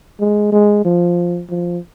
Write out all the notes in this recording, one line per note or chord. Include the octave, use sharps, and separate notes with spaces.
G#3
G#3
F3
F3